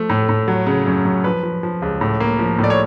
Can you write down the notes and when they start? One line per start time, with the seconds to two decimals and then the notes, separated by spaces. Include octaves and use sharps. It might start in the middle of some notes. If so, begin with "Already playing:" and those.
Already playing: F3 A3
0.10 A2
0.29 A2
0.48 F#3
0.67 C#3
0.86 F#2
1.05 F#2
1.24 F3 B4
1.43 F3
1.63 F3
1.82 C#2
2.01 A2
2.20 A#3
2.39 F3
2.59 A2
2.64 D5
2.70 C#5